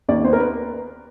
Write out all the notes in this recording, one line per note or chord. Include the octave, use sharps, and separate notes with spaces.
D#2 D5
B3 C5
A#4
B4